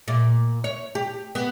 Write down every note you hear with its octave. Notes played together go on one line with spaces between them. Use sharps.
A#2
C#5
G4
B3